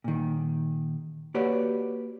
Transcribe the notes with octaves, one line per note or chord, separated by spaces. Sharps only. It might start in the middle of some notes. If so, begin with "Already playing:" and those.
A#2 D#3
A#3 F#4 G4 B4 C#5 D5